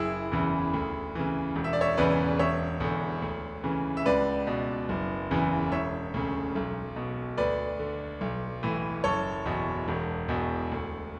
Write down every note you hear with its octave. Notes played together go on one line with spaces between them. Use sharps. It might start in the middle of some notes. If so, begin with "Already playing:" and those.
Already playing: F#1 E4 G#4
E2 C#3 E3
D2
C#3 E3
E1
E5
D5
C#5 E5
E2 C#3 E3 B4 D5
E1 C#5 E5
E2 D3
D2
C#3 E3
E5
C#2 B4 D5
B2
F#1
E2 C#3 E3
E1 C#5 E5
D2 C#3
B1
B2
D2 B4 D5
D3
B1
A2 E3
F#1 A4 C#5
E2 B2
E1
E2 B2
D2